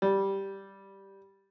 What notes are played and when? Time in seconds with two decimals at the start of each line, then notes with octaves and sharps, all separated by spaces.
0.02 G3